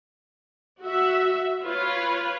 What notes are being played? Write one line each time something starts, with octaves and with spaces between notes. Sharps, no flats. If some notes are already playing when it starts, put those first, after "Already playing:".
F#4 E5
F4 B4 C#5